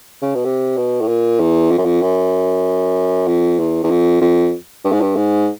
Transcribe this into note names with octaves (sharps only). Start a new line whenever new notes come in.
C#3
B2
C3
B2
A2
A#2
E2
F2
F#2
F2
F#2
F2
E2
E2
F2
F2
G2
G#2
G2
G#2